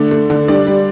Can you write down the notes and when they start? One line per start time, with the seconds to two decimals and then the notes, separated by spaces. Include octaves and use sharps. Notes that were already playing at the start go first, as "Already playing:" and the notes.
Already playing: D3 A3 D4 D5
0.11 A3
0.30 D3
0.48 G3 D4 D5
0.67 G3